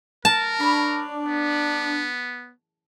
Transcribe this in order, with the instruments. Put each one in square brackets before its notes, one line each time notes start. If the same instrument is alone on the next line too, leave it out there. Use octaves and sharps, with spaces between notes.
[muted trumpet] A#4 [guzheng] A5
[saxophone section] D4 [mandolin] C#5 B5
[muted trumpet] B3